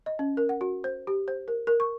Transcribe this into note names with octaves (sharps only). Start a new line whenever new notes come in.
D#5
C#4
A#4
F#5
F#4
C5
G4
C5
A#4
A#4
C#6